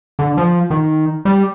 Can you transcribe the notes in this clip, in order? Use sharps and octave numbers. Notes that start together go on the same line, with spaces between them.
D3
F3
D#3
G3